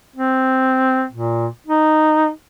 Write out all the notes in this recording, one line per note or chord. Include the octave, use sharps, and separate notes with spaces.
C4
A#2
D#4